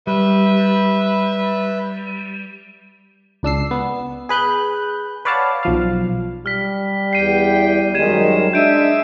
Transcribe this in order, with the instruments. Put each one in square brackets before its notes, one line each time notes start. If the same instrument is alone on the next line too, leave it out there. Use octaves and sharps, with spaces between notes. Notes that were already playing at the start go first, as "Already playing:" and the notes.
[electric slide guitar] G3 [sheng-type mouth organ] B4 E5
[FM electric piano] C#2 D4 E6 C7
B3
G#4 B4 F#6 G6
B4 C#5 D5 F5 F#5 A5
B1 F3 F5
[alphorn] G3 [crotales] F6 B6
[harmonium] E2 G5 [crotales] C7 D#7
[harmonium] F#2 D#3 G#3 [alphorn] G3 [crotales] G#6 D#7 E7
[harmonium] G#3 E5 [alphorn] D4 [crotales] G6 D7 D#7